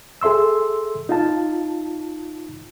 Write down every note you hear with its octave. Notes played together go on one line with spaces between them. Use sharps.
G#4 A4 E5 C6 E6
D#4 F4 F5 A5